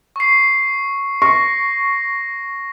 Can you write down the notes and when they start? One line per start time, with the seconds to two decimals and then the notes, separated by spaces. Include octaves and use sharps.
0.16 C#6 C7
1.22 C#6 A#6